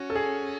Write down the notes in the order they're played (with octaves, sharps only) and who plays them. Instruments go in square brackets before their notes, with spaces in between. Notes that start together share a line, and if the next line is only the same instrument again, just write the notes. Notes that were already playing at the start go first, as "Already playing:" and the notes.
Already playing: [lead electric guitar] C#4 [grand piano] F#4
[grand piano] A4
G#4